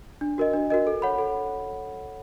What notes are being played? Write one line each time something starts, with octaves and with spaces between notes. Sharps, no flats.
D4
F#4 A#4 D#5
D4
F#4 A#4 D#5
A4
C#5 F#5 B5
A4